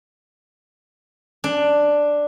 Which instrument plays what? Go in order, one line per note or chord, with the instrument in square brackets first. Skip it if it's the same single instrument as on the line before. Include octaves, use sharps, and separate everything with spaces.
[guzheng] D4